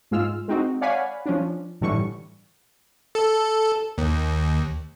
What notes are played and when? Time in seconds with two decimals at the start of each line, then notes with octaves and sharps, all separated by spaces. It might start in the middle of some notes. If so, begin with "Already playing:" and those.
0.11 G#2 G#3 F4 E6 F6
0.48 G#3 C4 D#4 F#4
0.81 C#5 D5 F5 F#5 G#5 B5
1.26 F3 C#4 D4
1.81 G1 A2 D3 E3 G3 C#6
3.15 A4
3.98 D#2